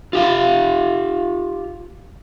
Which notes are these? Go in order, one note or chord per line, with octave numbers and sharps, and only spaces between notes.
F4 G4 F5